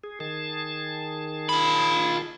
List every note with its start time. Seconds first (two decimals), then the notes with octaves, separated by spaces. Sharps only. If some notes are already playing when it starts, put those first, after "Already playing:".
0.03 G#4
0.20 D#3 G#4 A5
1.49 F4 B5